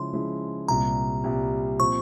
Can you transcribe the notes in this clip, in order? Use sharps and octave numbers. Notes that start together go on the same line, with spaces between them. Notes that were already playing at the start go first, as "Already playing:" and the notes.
Already playing: C#3 F3 G#3 E4 C6
C#3 F3 G#3 E4
C2 A#2 G3 A#5
C2 A#2 G3
A#2 F3 C4 C#6